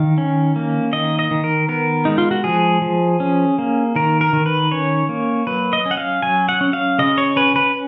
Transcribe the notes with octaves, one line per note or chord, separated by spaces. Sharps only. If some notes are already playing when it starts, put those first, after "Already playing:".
Already playing: D#3 F5
C#4
A#3
D#3 D#5
D#5
D#3
A#4
B3 A#4
G#3 D#4
F4
F#4
F3 G#4
F3
C#4
A#3
D#3 A#4
A#4
D#3
B4
C#4 C#5
A#3
F#3 B4
D#5
C#4
F#5
F5
F#3 G#5
F#5
C#4
F5
C#3 D#5
C#5
C#4 B4
B4